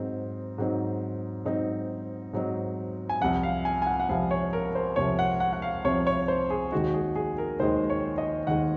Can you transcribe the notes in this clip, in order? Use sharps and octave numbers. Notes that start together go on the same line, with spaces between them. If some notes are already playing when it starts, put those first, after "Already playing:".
Already playing: G#2 F#3 C4 D#4
G#2 F#3 C4 D#4
G#2 F#3 C4 D#4
G#2 F#3 C4 D#4
G#5
C2 C3 F3 F#5
F5
G#5
G#5
F#5
F#5
C2 C3 F3 F5
C#5
A#4
C5
C2 C3 F3 C#5
F#5
F#5
F#5
F5
C2 C3 F3 C#5
C#5
C5
G#4
D#2 D#3 G#3 D#4 F#4
G#4
G#4
A#4
D#2 D#3 G#3 D#4 C5
C#5
D#5
D#2 D#3 G#3 D#4 F#5